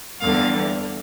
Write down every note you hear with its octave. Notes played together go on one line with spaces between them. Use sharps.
E2 D3 G3 F5